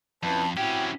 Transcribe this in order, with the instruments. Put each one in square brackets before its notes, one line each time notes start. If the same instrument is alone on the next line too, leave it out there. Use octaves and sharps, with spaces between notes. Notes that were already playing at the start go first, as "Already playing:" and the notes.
[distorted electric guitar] F2 [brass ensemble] C#4 E4 B4 [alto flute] A5
[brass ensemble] C4 E4 F#4 [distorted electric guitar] C#4 G4 [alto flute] G5